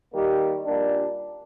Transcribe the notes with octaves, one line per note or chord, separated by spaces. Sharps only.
D#3 G3 A#3 D#4 G4
A#2 G3 A#3 D4